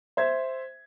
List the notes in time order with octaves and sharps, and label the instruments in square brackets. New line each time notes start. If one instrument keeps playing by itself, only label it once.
[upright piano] C5 E5 G#6